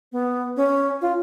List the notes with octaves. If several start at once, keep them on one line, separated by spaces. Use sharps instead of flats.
B3
C#4
F4